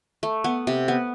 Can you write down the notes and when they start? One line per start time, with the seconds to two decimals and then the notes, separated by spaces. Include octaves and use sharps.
0.23 A3
0.44 B3
0.67 C3
0.88 B3